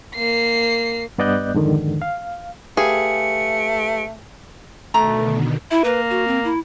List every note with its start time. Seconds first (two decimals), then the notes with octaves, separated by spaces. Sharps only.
0.15 A#3 C7
1.18 G2 B3 D5 D#5 F#6 G6
1.54 F2 G#2 D3 D#3
2.02 F5
2.77 A3 G4 G#4 B4 F5 C#7
4.94 B2 D3 D#3 A3 A#5
5.71 E4 E5
5.84 A#3 B4
6.10 F#4
6.27 C4
6.44 E4